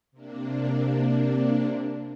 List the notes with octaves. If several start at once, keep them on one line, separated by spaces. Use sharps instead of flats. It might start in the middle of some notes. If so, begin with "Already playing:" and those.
C3 A#3 D4